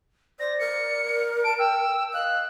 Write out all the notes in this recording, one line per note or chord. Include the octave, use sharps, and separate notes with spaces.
C5 D5 A#6
A#4 C#7
A5 D7
G5 E6
D#5 F5 F#6